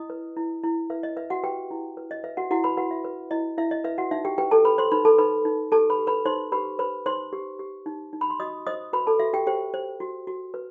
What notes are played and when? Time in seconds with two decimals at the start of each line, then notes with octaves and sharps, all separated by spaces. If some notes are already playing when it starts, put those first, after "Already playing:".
Already playing: E4 D#5 D#6
0.10 B4
0.37 E4
0.63 E4
0.90 B4 E5
1.03 D#5
1.16 B4 E5
1.30 F#4 F#5
1.43 G4 B4 G5
1.71 E4
1.97 B4
2.11 D#5
2.24 B4 E5
2.37 F#4 F#5
2.51 E4 F#4 F#5
2.64 B4 B5
2.77 F#4 B4 F#5
2.91 E5
3.04 B4
3.31 E4 D#5
3.58 E4 E5
3.71 D#5
3.84 B4 E5
3.98 F#4 F#5
4.11 D#4 E5
4.25 G4 G5
4.38 G4 B4 G5
4.51 A4 A5
4.65 B4 B5
4.78 C5 C6
4.91 D#4 B4 B5
5.05 A4 A5
5.18 D#4 B4 B5
5.45 D#4
5.72 G4 A4 A5
5.90 B4 B5
5.98 G4
6.07 B4 B5
6.26 D#4 C5 C6
6.52 G4 B4 B5
6.79 B4 C5 B5
7.06 D#4 C5 C6
7.33 G4
7.59 G4
7.86 D#4
8.13 D#4
8.21 B5
8.30 C6
8.40 F#4 D#5 D#6
8.67 C5 D#5 D#6
8.93 F#4 B4 B5
9.07 A4 A5
9.20 F#4 E5
9.33 G4 G5
9.47 G4 C5 G5
9.74 C5
10.00 F#4
10.27 F#4
10.54 B4